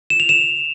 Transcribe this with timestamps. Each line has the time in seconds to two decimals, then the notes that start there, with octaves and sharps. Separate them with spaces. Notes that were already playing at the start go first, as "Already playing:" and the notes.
0.10 E7
0.20 F7
0.29 E7